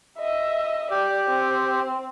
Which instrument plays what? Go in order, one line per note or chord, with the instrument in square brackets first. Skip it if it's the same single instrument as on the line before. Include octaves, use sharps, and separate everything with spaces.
[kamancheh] D#5 E5
[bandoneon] G4 [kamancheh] D5
[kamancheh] C4